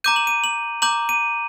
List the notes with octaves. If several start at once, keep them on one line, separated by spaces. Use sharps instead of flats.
A#5 D6 G6 D#7
F#7
D#7
F#7
A#5 D6 G6 F#7
D#7